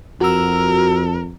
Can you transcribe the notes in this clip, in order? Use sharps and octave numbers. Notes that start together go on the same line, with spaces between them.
F2 F#4 A#4 E6